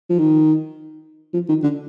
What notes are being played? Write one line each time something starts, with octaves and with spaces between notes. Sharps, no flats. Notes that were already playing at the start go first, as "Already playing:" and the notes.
F3
D#3
F3
D#3
D3